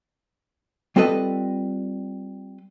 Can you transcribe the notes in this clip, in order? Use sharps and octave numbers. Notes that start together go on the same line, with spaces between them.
G3 C4 F4 A4 B4 D#5